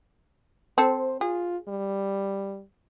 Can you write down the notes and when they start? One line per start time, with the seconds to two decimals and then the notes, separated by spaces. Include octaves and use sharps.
0.78 C4 A4 C5
1.21 F4 G#4
1.68 G3